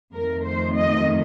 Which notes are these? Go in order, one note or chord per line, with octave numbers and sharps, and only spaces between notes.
F2 D#3 A3 A#4
C5
D#5